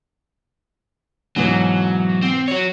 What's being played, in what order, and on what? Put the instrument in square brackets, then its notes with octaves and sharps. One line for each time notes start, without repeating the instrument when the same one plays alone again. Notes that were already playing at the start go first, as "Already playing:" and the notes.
[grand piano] G#2 B2 E3 [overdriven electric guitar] F#3
[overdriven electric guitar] C4
F#4 C#5